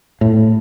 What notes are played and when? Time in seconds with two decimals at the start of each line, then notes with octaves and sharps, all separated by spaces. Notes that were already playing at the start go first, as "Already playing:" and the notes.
0.21 A2